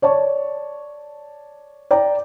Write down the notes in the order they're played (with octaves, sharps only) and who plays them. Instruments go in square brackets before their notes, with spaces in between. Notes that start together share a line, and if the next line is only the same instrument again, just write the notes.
[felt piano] C#5 D5 A5 C#6
D5 G5 A#5